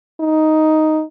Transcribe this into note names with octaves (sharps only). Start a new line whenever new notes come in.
D#4